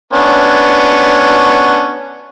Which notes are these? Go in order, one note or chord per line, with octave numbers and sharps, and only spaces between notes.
B3 C#4 D4